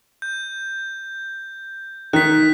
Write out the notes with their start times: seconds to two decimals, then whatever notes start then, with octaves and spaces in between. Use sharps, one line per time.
0.22 G6
2.13 D#3 F#6 B6